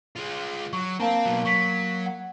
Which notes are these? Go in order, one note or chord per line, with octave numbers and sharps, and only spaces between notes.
G#3 F4
F#3 C#6
A#3 C4 F5 A5 A#5
B2 F#3
F#3 C#6 B6
F#5